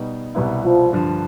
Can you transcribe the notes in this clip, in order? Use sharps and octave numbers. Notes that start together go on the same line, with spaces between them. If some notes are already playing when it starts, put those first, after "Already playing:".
Already playing: B2 G3 B3 D#4
C2 B2 G3 B3 E4
F3
G2 D3 F3